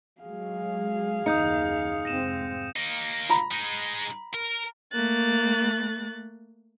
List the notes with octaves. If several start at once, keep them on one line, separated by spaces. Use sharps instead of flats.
F#3 G#3 G#4 F5
F#1 D#2 D#4 D#6 G6 C#7
F1 G#2 C4 A#6 D#7 E7
A#3 D#4
A#5 B5
G#3 D#4
A#4
A3 A#3 F#6 A6